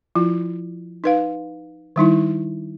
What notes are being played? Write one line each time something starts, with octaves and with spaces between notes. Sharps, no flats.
F3 E4 F4
D#4 B4 F5
D#3 G3 D#4 E4